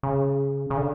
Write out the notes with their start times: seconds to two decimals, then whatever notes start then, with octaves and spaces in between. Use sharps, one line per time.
0.03 C#3
0.70 C#3
0.77 D3